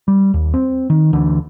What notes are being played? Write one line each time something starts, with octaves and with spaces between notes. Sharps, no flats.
G3
D#2
C4
D#3
D2 D3 E3 D4